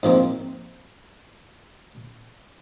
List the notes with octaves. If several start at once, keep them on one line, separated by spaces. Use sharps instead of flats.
G#2 F3 A#3 C4